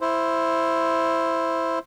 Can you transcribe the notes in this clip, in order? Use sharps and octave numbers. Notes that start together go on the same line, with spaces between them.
E4 C5